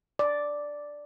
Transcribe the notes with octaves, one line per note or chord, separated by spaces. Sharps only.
D5